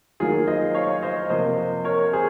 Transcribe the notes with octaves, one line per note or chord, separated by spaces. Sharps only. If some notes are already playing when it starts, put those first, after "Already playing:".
D#3 F#3 A#3 F4 G#4
C5 D#5
C#5 F5
C5 D#5
C3 F3 A#3 C5 D#5
A#4 C#5
G#4 C5